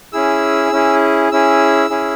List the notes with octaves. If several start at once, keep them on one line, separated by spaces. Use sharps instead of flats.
C#4 E4 G#4 E6
C#4 E4 G#4
C#4 E4 G#4 E6
C#4 E4 G#4